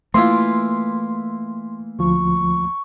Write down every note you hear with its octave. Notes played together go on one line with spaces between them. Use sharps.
E3 A3 A#3 E4 F4 C6
D2 F3 C#6